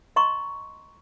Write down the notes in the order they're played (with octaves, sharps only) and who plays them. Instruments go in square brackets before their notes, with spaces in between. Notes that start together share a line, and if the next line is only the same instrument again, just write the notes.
[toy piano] D#5 A#5 C6 C#6